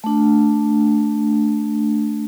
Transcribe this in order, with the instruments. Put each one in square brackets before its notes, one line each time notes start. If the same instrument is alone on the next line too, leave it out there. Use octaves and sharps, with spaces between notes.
[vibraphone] A3 D4